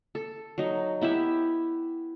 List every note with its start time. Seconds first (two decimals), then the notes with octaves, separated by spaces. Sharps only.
0.15 A4
0.58 F#3 D#4
1.01 B3 E4 G4 E5